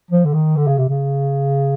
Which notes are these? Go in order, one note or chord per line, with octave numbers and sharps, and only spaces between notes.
F3
D3
D#3
D3
C#3
C3
C#3